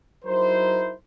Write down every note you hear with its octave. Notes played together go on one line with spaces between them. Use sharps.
F#3 D#4 E4 A#4 C5